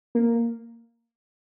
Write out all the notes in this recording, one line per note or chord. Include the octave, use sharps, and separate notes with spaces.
A#3